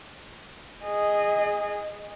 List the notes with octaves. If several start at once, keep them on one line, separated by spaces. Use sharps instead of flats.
G#4 D#5